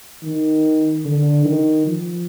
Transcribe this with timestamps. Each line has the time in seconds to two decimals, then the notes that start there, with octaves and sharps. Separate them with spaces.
0.23 D#3
1.05 D3
1.45 D#3
1.87 F3